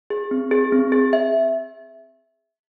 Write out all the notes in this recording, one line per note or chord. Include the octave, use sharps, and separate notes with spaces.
G#4
C4
G#4
C4
G#4
E5